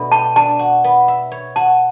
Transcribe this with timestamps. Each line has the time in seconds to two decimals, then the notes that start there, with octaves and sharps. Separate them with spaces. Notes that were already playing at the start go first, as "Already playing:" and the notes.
Already playing: B2 A3 D4
0.12 G4 A5
0.36 D4 A5
0.59 F#4
0.84 B3
1.08 E5
1.32 C#5
1.56 F#4 A5